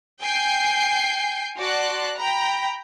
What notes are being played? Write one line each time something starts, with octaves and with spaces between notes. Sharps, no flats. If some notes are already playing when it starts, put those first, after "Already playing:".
G5 G#5 G6 C7
F#4 D5 A5 C6 F#6
G5 A#5 B5